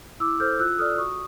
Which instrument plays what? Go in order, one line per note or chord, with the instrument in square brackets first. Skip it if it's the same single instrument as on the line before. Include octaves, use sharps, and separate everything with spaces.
[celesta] E4 D6 E6
A4 C5 F6 G6
F4 E6 F#6
A4 D5 D#6 F6
F#4 C#6 D#6